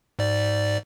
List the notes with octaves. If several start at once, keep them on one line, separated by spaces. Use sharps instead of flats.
G#2 D5